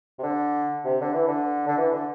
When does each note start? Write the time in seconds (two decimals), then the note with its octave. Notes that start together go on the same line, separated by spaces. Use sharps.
0.19 C3
0.23 D3
0.85 C3
1.01 D3
1.14 E3
1.28 D3
1.67 D3
1.78 E3
1.93 D3